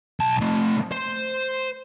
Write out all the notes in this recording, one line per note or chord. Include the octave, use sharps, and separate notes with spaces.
B1 A5
F3 A3
C5